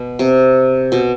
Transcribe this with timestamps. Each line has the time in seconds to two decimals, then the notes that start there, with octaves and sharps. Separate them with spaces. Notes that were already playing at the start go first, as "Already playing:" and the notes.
Already playing: B2
0.19 C3
0.92 B2